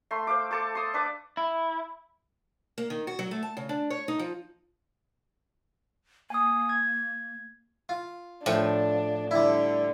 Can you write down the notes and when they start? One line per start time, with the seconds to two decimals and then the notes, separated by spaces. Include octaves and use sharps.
0.11 A3 C6
0.27 C5 F5 D6
0.51 A4 A5 C6 D6
0.75 C6 D#6
0.94 D4 B4 D6
1.37 E4
2.78 A#3
2.90 D#3
3.07 F#4
3.19 F#3
3.31 A3
3.43 A5
3.57 C#3
3.69 D4
3.90 C#5
4.08 D#4
4.19 F3
6.30 A#3 G#5 D#6
6.69 G#6
7.89 F4
8.46 A2 F3 D4
9.31 D3 G3 E4